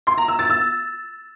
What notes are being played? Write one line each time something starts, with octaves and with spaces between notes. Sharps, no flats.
C6
A#5
E6
A6
E6